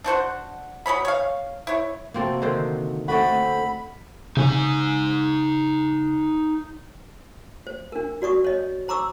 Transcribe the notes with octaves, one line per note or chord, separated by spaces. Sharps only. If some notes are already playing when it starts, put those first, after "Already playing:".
D4 F#4 C5 F#5
F#3 G#4 C#5 B5
C#5 F5
E4 C#5
C3 A#3 C4 F#4 A4
D3 D#3 C5
D3 A3 C4 F#4 D5 D#5 F#5 B5
C#3 D#4 G#5
C5
D4 A#4
F#4 D5 C#6 D#6
C#5 D#5
C5 A#5 C#6 D6 E6